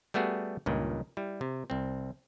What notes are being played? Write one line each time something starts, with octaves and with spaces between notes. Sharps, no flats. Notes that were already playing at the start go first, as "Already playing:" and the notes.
G3 A3 B3 F#4 G#4
C#2 G2 A#2 D#3
G3 E4
C3
C2 C4